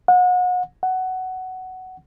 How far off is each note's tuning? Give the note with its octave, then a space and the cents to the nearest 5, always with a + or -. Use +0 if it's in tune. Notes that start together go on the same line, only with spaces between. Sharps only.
F#5 -35
F#5 +10